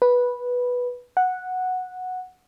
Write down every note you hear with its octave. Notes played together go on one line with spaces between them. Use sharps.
B4
F#5